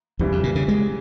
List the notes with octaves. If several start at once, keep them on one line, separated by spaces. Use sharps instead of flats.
F2 C#3 E3 G3
F2
A#2
C#3
G#3